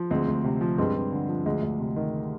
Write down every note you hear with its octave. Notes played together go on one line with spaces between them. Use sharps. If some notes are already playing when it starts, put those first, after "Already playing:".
Already playing: F3
D2 G#3 C4
D2
C3
F3
G2 G#3 C4
G2
D3
F3
D2 G#3
D2
C3
D#3